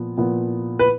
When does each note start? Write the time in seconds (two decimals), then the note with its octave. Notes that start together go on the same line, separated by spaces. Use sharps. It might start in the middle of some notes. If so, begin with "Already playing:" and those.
Already playing: A#2 F3 B3
0.17 A#2 F3 B3
0.79 B4